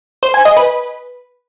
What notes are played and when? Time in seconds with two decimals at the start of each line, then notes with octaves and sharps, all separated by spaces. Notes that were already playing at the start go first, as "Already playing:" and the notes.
0.23 C5
0.34 G#5
0.45 D#5
0.57 B4